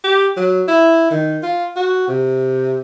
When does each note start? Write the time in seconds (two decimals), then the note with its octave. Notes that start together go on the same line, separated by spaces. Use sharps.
0.04 G4
0.37 F#3
0.68 E4
1.11 D#3
1.43 F4
1.76 F#4
2.08 C3